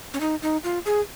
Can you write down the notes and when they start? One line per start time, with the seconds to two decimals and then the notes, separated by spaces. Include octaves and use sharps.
0.14 C#4
0.20 D#4
0.42 D#4
0.64 F4
0.86 G#4